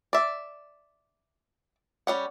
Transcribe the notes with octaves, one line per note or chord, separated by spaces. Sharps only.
D5 E5
G3 C#4 F#5